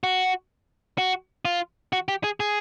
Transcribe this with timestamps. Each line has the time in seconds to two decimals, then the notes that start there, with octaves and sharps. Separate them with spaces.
0.04 F#4
0.98 F#4
1.45 F4
1.93 F#4
2.08 G4
2.24 G#4
2.40 G#4